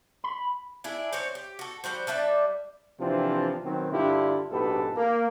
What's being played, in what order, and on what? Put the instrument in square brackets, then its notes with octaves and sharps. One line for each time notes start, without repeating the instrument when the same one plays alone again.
[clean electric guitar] B5
[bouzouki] D4 E4 G#4
C4 F#4 C5 C#5
G4
F#4 A4
F3 G3 F#4 C5
G3 D4 E5 A5
[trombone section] E2 C3 E3 F3 C4 D4
B2 D#3 F#3 C4
G2 D3 D4 E4 F4 G4
A#1 G#2 B2 G4 A4 B4
A#3